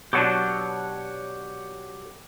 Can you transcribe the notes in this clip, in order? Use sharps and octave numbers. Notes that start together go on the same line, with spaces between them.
B2 F#3 D4 G4 C#5 F#5